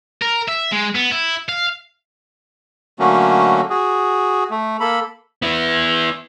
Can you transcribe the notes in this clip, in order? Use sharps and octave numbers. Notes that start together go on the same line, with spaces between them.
A#4
E5
G#3
B3
E4
F5
D3 F#3 A3 A#3 C#4 F#4
F#4 G#4
A3
A#3 A4 B5
B3 E4